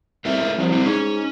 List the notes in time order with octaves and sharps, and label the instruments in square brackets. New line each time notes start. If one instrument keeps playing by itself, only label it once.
[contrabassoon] C2 [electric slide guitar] A3 A#4 E5
[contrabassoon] C#2
[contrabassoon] C2 [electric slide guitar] F3 F#3
[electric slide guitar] G3 C4 E4
[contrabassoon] G#2 [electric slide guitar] C#4